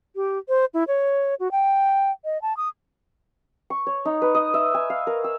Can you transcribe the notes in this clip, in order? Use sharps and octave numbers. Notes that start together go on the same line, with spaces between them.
G4
C5
E4
C#5
F#4
G5
D#5
A5
D#6
C#6
C#5
D#4
B4
D#5
E5
G#5
F5
A#4
E6